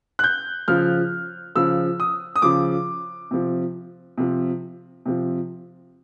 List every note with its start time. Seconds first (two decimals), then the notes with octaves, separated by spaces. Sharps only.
0.19 F#6
0.24 G6
0.68 C#3 F3 F6
1.55 C#3 F3 E6
2.00 D#6
2.36 D#6
2.42 C#3 F3 D6
3.31 C3 F3
4.18 C3 F3
5.06 C3 F3